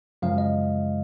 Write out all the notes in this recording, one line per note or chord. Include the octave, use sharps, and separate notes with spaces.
F#2 C#3 F3 G#3 F5
D#5